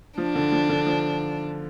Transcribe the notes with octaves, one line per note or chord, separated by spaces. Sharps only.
F3 D4
D3
F3
D3
F3